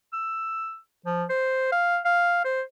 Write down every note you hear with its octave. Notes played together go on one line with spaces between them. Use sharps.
E6
F3
C5
F5
F5
C5